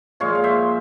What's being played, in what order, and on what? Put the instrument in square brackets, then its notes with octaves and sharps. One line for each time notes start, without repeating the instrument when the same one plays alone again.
[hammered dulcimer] A#2 F3 G#3 C#5 F5
F5
C5 E5